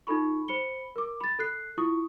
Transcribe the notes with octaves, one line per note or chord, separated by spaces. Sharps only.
D#4 F4 A4 B5 C#6
C5 B5 C#7 G7
A#4 D6
B5 A6
A4 F#6 C7
E4 F4 C#6 D#6